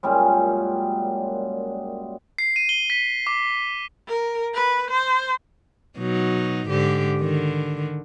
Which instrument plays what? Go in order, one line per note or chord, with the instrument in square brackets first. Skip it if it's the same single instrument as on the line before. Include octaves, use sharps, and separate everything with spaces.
[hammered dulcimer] F#2 A#2 G3 G#3
[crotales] C7
D#7
G7
B6
D6
[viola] A#4
B4
C5
[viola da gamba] B2 F#3 D#4
G#2 D3 G4
D3 D#3